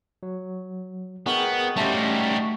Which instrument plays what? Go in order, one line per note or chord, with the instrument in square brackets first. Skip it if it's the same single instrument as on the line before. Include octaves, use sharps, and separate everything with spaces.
[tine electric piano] F#3
[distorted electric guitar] B3 [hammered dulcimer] F#4 D#5 [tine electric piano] G#4 A#4 G5
[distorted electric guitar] G3 D#4 [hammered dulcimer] A3 [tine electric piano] C#4 G4 C6